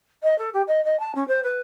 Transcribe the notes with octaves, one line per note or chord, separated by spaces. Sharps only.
D#5
A4
G4
D#5
D#5
A5
C#4
C5
B4